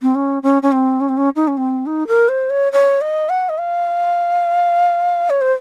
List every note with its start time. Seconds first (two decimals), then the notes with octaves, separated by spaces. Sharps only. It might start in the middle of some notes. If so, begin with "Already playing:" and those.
0.02 C4
0.15 C#4
0.43 C#4
0.62 C#4
0.72 C4
1.00 C#4
1.09 C4
1.17 C#4
1.36 D#4
1.48 C#4
1.57 C4
1.86 D#4
2.08 A#4
2.29 C5
2.50 C#5
2.72 C#5
3.01 D#5
3.29 F#5
3.49 D#5
3.58 F5
5.30 C#5
5.41 C5